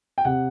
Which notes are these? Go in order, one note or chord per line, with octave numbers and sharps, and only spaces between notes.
G5
C3 F#5